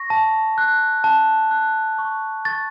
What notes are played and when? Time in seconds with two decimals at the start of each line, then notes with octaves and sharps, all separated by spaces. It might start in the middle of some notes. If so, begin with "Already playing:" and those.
Already playing: C#6 A#6
0.10 A5
0.58 F#6
1.04 A5
1.51 F#6
1.99 C#6
2.45 C#6 A6